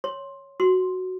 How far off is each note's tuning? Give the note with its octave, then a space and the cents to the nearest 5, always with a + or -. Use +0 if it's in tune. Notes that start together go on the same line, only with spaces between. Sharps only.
C#5 +0 C6 +10
F#4 +0 C6 +0